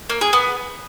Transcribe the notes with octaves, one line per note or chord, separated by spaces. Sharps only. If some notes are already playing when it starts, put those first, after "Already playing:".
A#3
G#4
B3